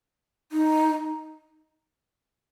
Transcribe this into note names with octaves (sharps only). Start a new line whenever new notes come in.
D#4